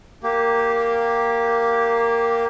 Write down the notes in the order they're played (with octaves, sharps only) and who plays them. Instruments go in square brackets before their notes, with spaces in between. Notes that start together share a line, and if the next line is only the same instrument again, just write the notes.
[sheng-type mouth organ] A#3 G4